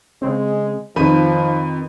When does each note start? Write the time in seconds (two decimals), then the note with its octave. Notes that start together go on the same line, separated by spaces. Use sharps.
0.22 C#3 G#3 C4
0.96 F2 D#3 F3 D#4 B4 D#7